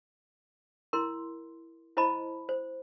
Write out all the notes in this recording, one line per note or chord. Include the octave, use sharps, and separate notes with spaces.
E4 A#4 C6
E4 C5 D#5 A5 B5
C5